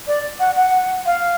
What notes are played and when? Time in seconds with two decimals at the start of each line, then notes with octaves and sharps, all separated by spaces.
0.07 D5
0.40 F#5
0.56 F#5
1.06 F5